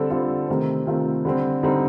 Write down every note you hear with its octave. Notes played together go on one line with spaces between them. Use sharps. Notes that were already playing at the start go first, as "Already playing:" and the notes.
Already playing: D3 G3 C4 A4
D3 G3 C4 F4
C3 D#3 A3 C4
C3 D#3 A3 C4 F4
D3 G3 C4
D3 G3 C4 D#4